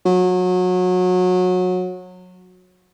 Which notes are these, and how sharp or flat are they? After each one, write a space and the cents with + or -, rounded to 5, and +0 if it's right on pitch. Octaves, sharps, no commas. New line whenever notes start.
F#3 -25